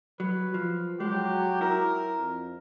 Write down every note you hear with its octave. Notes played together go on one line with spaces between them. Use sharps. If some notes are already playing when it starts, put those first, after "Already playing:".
F#3 B4
F3
F#3 G#3 G4
E4 A#4
F2